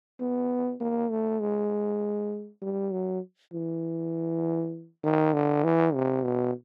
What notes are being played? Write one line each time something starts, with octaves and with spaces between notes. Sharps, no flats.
B3
A#3
A3
G#3
G3
F#3
E3
D#3
D3
E3
C3
B2